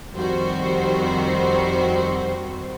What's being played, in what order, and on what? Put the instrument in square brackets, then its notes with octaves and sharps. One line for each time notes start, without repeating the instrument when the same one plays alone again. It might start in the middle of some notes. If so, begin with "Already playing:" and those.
[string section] F2 D#3 G3 C4 F#4 C5